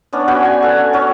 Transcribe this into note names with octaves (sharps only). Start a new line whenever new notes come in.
B3 C#4 D4
F#4 B4 G5 G#5
G#5
A4 F#5
C#4 F#4 C#5